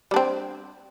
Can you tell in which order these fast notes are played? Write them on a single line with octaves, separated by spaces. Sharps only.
G3 D4 C4